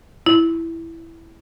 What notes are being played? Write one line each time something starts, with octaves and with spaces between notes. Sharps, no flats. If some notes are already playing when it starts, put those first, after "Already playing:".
E4